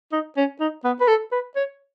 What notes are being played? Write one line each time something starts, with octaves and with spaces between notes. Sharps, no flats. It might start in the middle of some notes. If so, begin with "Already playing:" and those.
D#4
C#4
D#4
B3
B4
A4
B4
C#5